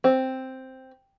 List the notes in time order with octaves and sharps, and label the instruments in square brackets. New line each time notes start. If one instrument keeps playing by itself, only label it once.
[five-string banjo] C4